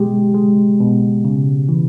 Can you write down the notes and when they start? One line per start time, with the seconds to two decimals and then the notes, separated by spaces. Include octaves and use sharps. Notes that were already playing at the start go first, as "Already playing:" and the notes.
Already playing: B2 G#3 G4
0.34 G#3
0.80 B2
1.25 C#3
1.69 E3